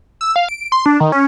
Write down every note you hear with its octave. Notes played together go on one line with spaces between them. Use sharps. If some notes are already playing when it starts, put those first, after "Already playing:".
E6
F5
D7
C6
D4
D#3
C#4